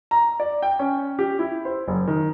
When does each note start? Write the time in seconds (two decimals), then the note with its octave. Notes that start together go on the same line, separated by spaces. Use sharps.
0.11 A#5
0.40 D5
0.62 G5
0.79 C#4
1.19 G4
1.39 E4
1.65 C5
1.88 F#1
2.07 D#3